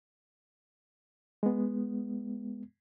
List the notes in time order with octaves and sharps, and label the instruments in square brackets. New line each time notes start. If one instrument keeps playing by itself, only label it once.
[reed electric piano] G#3 B3